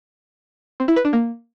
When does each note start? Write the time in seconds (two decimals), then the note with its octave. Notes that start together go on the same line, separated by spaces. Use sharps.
0.80 C4
0.88 E4
0.96 B4
1.05 D4
1.13 A#3